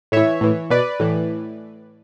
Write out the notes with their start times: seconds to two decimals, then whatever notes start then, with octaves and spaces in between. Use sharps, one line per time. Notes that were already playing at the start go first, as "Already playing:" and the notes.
0.12 A2 E3 C#5 E5
0.41 A2 E3
0.70 B2 B4 D5
1.00 A2 E3